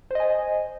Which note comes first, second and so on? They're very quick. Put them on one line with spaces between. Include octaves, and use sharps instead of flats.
C5 D#5 G#5